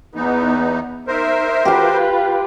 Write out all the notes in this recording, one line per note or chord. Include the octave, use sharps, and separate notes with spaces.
E2 E3 B3 D#4
D#4 A#4 C5 E5
F4 G4 B4 G5